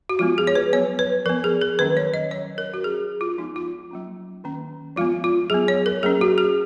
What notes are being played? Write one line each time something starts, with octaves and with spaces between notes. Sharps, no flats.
F#4
F3 G#3 B3 F4
G#4
C#5
B4
F#3 B3 C#5
B4
F3 B3 A#4
G#4
A#4
D#3 F#3 A#3 C#4 B4
C#5
D#5
F#3 C#4 C#5
A#4
F#4
F#3 C#4 G#4
F4
F3 G#3 B3 D#4
F4
F#3 A#3 C#4
D#3 A#3 C#4
F3 G#3 B3 F4
F4
F#3 B3 G#4
C#5
A#4
F#3 A#3 C#4 G#4
F#4
G#4